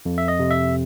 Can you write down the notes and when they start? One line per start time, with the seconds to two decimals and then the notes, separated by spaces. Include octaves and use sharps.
0.05 F2
0.18 E5
0.28 D#5
0.39 C3
0.51 E5